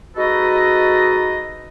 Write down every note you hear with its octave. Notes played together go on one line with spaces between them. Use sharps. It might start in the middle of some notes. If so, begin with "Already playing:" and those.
G#3 D#4 F#4 A4 B4 D#5